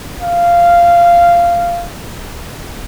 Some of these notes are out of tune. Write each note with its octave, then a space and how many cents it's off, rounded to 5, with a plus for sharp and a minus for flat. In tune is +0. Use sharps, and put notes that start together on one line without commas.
F5 -10